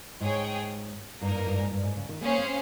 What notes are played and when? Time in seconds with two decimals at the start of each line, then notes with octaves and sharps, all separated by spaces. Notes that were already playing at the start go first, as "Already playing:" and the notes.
0.20 G#2 G#4 C#5 G5
1.21 G2 A#3 D#4 A#4
1.34 G2
1.47 G2
1.58 G#2
1.71 G2
1.83 G#2
1.96 C#3
2.09 D#3
2.21 A#3 C#4 G#4 C5 F5
2.38 C4